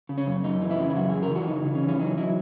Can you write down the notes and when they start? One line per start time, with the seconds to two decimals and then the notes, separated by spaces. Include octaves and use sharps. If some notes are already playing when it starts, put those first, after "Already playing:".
0.09 C#3
0.18 C#4
0.27 F#2
0.44 F#2 D#4
0.61 E3
0.70 E4
0.79 C#3
0.90 E4
0.96 F#2 F#4
1.09 G#4
1.14 C#3
1.23 A#4
1.30 E3
1.36 F#4
1.48 C#3 D#4
1.65 C#3
1.75 C#4
1.83 E3
1.88 C#4
2.00 F#3 D#4
2.17 F#3 E4